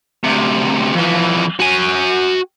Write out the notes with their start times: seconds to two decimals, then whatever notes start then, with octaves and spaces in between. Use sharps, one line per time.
0.24 D2 C3
0.95 F2 E3
1.60 F#4 G#5